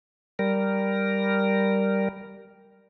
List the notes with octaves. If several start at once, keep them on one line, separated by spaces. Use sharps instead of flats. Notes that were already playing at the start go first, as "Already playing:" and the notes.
G3 A#4